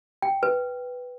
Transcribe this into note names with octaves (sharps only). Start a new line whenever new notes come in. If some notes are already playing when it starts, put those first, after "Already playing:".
G5
B4